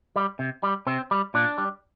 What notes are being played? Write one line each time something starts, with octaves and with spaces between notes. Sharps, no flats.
G3
C3
G3
C3 C4
G3
A#2 D4
G3